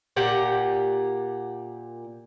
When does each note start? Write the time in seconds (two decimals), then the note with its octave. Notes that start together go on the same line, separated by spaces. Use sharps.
0.16 A#2 G4 F#5